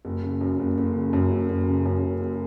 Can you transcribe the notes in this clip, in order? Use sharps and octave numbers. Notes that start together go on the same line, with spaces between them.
F#1
C#3
F#2
F#1
F#1
C#3
F#2
F#1
F#1
C#3
F#2
F#1
F#1